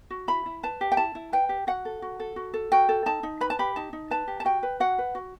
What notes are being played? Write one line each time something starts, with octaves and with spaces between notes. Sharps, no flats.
F#4
E4 B5
E4
B4 A5
G4
G5
E4 A5
E4
B4 G5
G4
F#4 F#5
A4
F#4
A4
F#4
A4
F#4 G5
A4
D#4 A5
D#4
B4 B5
A5
G4 B5
D#4 A5
D#4
B4 A5
G4
A5
F#4 G5
B4
F#4 F#5
B4
F#4